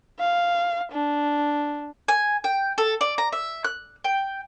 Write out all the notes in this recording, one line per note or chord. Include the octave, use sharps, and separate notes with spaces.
F5
D4
G#5
G5
A4
D5
A#5
E5
F#6
G5